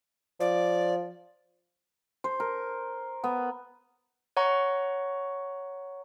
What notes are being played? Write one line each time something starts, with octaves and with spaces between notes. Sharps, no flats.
F3 D5
C5
A#4
B3
C#5 F#5 A#5 C#6